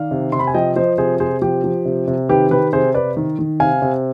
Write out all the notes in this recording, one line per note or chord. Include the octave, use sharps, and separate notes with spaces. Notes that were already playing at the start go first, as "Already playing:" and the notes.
Already playing: D#3 D5 F5
C3
C3 C6
B5
G#5
F3 D#5 G5
F3 C5 D#5
C3 G#4 C5
C3 G#4 C5
F3 G4
F3
C3
C3
D#3 G4 B4
D#3 G4 B4
C3 G#4 C5
C3 B4 D5
D#3
D#3
C3 F5 G#5
C3